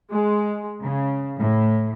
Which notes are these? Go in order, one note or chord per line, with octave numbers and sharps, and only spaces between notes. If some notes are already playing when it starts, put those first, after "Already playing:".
G#3
C#3
A2